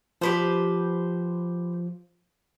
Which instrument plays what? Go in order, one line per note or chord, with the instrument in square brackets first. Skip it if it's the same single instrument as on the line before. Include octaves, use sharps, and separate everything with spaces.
[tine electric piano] F3 [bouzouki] G4 B4 C5